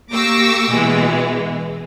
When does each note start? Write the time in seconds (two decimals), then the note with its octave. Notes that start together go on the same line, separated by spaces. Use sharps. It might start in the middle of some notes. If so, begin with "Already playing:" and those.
0.12 A#3 G4 C#6 D6 E6 A#6
0.71 B2 E3 G#3